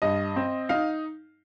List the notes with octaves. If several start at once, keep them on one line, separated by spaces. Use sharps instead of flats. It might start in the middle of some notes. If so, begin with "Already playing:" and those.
G2 D#5
C4
D#4 F5